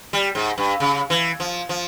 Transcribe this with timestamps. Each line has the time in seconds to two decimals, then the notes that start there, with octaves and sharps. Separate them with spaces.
0.13 G3
0.35 G#2
0.58 G2
0.80 C#3
1.10 E3
1.40 F3
1.69 F3